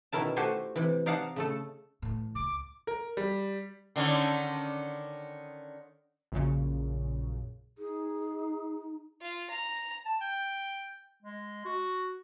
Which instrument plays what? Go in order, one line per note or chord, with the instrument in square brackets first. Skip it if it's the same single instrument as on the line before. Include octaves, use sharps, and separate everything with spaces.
[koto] B2 D#3 C#4 E4 A#4 A5
A3 F#4 G4 C5 G#5 A5
C3 E3
D#4 D5 F5 F#5 A5 A#5
C#3 A3 A4
[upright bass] A2 E3
[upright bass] C#2 C#3 [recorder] D6
[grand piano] A#4
G3
[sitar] D3 D#3 C#4
[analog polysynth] A#1 F#2 A#2 C#3
[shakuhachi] D#4 [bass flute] G#4
[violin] F4
A#5
[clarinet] A5
G5
G#3
F#4